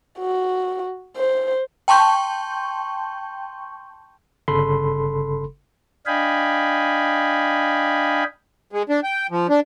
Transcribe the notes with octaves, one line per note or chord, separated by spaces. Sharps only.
F#4
C5
G5 A5 C6 C#6 G6
G1 C#3 A4 B5 C6
D4 D#5 F5 G5 G#5 B5
G#3
D4
G5
F3
D4